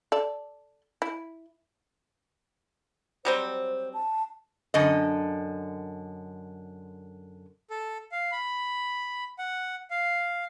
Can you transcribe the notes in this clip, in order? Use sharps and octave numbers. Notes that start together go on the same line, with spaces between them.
A4 D5
E4
F#3 G3 C4 C5
A5
F#2 D3 D#5
A4
F5
B5
F#5
F5